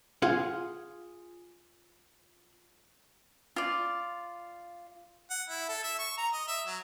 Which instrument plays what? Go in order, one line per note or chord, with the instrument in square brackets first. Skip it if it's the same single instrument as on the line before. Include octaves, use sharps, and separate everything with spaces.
[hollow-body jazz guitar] F4 G#4 F5 F#5
[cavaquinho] F4 D5
[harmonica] F#5
E4
A4
E5
C#6
A#5
D#5
E5
F#3